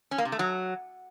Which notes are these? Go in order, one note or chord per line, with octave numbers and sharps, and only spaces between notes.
C#4
A#3
C3
A3
F#3